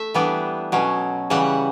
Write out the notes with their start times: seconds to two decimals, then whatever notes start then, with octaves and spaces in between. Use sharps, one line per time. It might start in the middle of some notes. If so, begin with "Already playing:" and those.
Already playing: A3 E5
0.14 E3 G3 B3 D4
0.72 B2 F#3 C#4
1.30 C#3 E3 G3 F#5